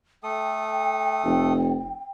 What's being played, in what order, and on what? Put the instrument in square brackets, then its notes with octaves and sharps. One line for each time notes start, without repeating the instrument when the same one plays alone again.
[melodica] A3 A4 D#6 [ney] G5
[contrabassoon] F1